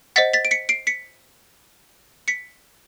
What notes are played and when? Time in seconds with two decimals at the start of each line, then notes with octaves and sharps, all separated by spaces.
0.16 C5 D#5 F#5 A6 B6
0.33 A6 B6
0.45 D7
0.51 B6 C#7
0.69 C7 D7
0.87 B6 C#7
2.28 B6 C#7